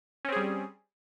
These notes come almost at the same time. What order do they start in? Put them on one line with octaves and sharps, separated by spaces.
C#4 C4 G#4 G3